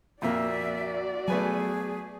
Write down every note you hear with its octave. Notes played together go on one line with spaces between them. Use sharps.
F2 A#2 A#3 F#4 D5 E5
F#3 A3 B3 G#4 B4 G#5